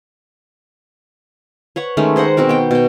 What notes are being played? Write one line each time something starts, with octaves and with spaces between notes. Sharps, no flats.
B4 C#5 F#5
D#3 G#3 A3 C#4
G#4 C5 D#5 F#5
B2 C4 F#4 A#4
B3 G5
B2 G5